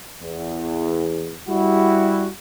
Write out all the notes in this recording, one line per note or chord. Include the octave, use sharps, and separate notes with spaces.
E2
G3 E4 F#4